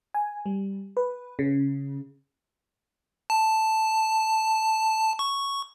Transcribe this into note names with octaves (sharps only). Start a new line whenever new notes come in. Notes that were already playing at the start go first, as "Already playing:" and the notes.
G#5
G3
B4
C#3
A5
C#6